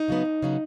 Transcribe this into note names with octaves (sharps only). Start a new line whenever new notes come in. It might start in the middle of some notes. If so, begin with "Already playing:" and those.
Already playing: D#4
C#3 F#3 B3
D#2
C#3 F#3 B3